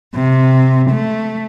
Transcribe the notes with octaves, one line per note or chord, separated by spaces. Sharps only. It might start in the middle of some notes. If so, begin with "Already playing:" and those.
C3
A3